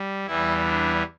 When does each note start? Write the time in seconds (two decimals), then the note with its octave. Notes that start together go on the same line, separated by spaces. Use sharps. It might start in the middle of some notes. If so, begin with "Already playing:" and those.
Already playing: G3
0.25 E2 E3 G3 E4
0.65 D4